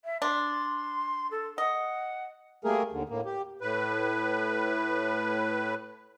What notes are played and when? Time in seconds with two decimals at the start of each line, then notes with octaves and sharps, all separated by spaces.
0.05 E5
0.22 D4 C6
1.31 A4
1.58 D#5 F#5
2.64 G3 A3 A#3 G#4 A#4
2.92 D#2 D3
3.09 A2 A#3
3.25 G4
3.61 A2 B4